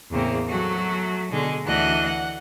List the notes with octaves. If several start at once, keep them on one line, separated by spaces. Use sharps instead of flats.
E2 A2 C#3 A#3 C4
F#3 A3 F#4
B2 D3 G#3
D2 E3 D4 F#4 D#5 F#6
F#5